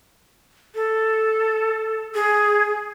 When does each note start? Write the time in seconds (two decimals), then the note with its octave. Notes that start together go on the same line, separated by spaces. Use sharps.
0.75 A4
2.15 G#4